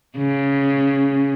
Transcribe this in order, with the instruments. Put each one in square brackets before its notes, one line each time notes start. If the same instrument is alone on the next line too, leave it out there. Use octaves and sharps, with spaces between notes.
[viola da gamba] C#3